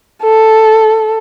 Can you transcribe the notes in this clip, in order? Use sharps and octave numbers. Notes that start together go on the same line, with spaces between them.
A4